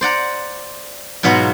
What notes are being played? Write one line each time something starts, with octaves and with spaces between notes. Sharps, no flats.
C5 D5 F#5 A#5
G#2 B2 F#3 B3 F4 F#4